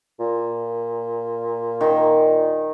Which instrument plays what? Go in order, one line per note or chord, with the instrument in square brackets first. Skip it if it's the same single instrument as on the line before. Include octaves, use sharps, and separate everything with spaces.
[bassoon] A#2
[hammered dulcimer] D#3